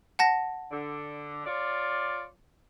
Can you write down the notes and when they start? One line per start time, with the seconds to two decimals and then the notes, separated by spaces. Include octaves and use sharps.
0.19 F#5 A5 A#6
0.72 D3
1.46 F4 C#5 D5